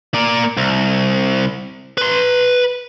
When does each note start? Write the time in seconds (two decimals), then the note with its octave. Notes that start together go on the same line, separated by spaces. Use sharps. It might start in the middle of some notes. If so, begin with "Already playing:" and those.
0.14 A#3 D5
0.57 C2
1.98 B4 C6